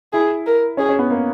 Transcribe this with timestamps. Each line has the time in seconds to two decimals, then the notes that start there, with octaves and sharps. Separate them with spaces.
0.13 E4 G#4
0.46 A#4
0.77 C#4 G#4
0.89 C#4
0.99 B3
1.10 A#3